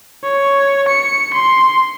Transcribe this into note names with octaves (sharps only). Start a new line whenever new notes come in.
C#5
C#7
C6